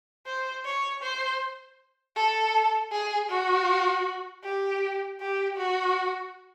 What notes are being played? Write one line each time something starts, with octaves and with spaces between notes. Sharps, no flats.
C5
C#5
C5
A4
G#4
F#4
G4
G4
F#4